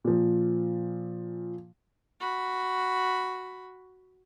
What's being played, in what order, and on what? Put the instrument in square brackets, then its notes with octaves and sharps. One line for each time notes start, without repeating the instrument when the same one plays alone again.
[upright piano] A#2 F3
[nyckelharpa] F#4 B5